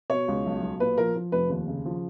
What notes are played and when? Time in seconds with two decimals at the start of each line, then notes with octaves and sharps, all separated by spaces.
0.10 B2 C#5
0.28 C#2
0.46 B1
0.62 B1
0.80 A#2 B4
0.98 F3 A#4
1.15 F3
1.32 F1 B4
1.50 D#2
1.68 C#3
1.85 F3